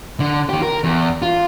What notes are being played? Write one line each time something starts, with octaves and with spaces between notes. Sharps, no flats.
D3
D#3 G4
A#4
E2
F4